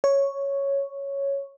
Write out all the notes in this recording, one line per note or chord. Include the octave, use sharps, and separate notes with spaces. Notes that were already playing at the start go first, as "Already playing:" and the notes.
C#5